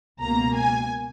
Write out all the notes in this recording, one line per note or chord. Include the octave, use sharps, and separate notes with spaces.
C#2 B2 A#3 A#5
G#5